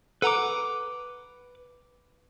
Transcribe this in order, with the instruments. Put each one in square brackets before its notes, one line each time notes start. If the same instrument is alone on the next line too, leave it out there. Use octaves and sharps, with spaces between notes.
[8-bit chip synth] A4 F#5 A#5 [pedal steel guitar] B4 D6